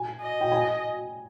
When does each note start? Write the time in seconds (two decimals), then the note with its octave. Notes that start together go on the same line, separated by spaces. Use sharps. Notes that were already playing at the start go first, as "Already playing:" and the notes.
Already playing: G#5
0.21 D#5
0.41 G5
0.52 G#5